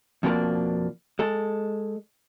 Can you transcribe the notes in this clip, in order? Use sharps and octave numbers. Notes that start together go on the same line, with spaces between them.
F2 B2 F3 A#3 D4
G#3 A4